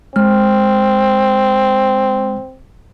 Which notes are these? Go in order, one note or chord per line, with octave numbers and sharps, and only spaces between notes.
G#3 C4 F6